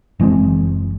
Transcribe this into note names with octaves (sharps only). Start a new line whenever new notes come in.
F#1 E3 G#3 C4